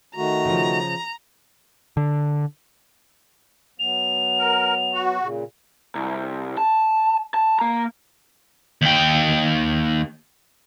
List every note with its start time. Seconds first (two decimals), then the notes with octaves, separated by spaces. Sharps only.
0.16 D#3 A3 F#4 A#5
0.45 C#3 F3
1.97 D3
3.79 F#3 B3 F7
4.39 A#4
4.94 F#4
5.20 A#2 C#3
5.95 C2
6.57 A5
7.34 A5
7.59 A#3 A#5
8.82 D#2 G5